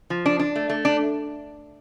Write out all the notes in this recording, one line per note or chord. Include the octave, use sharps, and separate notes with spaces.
F3
D4
D4
A3
A3
D4